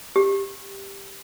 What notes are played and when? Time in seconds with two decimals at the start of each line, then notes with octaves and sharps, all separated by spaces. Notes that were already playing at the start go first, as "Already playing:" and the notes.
0.16 G4